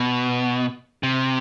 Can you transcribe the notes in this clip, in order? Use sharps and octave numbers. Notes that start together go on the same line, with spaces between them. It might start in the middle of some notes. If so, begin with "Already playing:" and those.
Already playing: B2
C3